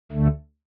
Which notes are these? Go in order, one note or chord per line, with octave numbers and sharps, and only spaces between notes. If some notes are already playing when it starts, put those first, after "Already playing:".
D2 D3 A3